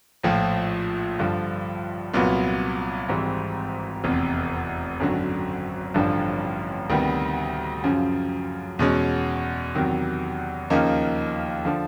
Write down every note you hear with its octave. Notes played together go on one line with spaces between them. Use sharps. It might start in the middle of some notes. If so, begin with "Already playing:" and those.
A#1 A2 F3
G2 D3 F3
C2 A#2 F#3 B3
G#1 G#2 E3 G3 C4
F1 E2 C3
G#1 F#2 D3 F#3
A1 G2 D3 F3
D2 C3 D#3 G3 B3
F#2 C#3 F3
E2 B2 G#3 C#4
E2 C3 D#3 F#3
D#2 C#3 F3 A#3 D#4
D3 F3